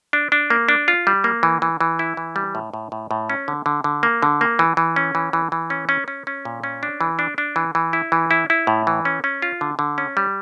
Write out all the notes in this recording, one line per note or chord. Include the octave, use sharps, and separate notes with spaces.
D4
D4
A#3
D4
F4
G3
A#3
E3
E3
E3
E4
E3
G3
A2
A2
A2
A2
C#4
D3
D3
D3
A#3
D3
A#3
E3
E3
C#4
E3
E3
E3
C#4
C#4
C#4
C#4
A#2
C#4
D4
E3
D4
D4
E3
E3
E4
E3
E4
E4
A2
E3
C#4
C#4
F4
D3
D3
C#4
G3